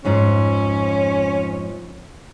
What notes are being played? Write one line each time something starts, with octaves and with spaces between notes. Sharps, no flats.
F2 G#2 F3 C#4